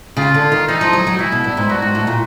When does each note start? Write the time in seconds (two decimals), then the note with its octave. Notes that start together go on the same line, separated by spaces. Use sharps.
0.17 C#3 F4
0.34 D3
0.52 D#3
0.68 E3 D#4
0.81 F3
0.93 F#3
1.07 F#3
1.18 E3 E4
1.32 B2
1.44 G2
1.57 G#2
1.69 G2 F#4
1.82 G#2
1.95 A2
2.07 A#2